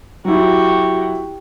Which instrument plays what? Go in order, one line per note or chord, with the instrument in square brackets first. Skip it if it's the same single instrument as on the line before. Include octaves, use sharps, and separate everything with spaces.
[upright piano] F#3 E4 [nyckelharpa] F#4 G4